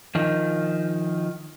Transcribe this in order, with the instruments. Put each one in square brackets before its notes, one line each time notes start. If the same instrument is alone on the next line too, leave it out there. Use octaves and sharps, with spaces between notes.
[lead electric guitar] D#3 F3